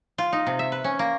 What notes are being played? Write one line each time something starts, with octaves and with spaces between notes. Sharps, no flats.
F4
D#4
C3
E5
B4
C#4
A#3